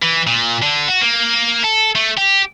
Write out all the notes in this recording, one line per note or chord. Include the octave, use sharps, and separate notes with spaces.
E3
A#2
D3
F#4
A#3
A4
A3
G4